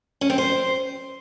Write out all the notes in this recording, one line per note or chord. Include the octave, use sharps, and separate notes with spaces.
C#4
C4
C5